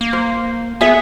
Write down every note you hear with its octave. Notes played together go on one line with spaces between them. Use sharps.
A#3
C5
B3 G#4 E5